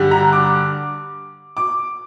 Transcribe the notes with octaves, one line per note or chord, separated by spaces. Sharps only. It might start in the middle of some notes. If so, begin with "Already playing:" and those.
Already playing: G2 D3 G3
A#5
D6
D6